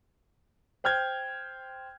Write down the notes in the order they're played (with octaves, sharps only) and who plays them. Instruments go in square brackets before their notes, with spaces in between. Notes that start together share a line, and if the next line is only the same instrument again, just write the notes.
[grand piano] C5 G5 F6 G6 G#6